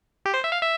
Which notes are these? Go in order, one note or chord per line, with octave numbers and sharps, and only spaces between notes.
G4
C5
E5
F5
E5